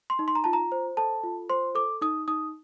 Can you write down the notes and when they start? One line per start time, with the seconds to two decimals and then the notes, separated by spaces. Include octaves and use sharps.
0.10 C6
0.19 D#4
0.28 C6
0.35 A#5
0.44 F4 A5
0.53 A#5
0.72 C5
0.97 A4 A5
1.24 F4
1.50 C5 C6
1.75 A4 D6
2.01 D#4 D#6
2.28 D#4 D#6